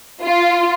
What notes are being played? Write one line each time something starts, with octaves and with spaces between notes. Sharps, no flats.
F4